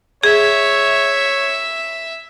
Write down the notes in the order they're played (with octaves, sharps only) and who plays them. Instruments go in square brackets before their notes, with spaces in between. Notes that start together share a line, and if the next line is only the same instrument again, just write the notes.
[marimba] G#4 [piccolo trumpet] C#5 [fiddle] E5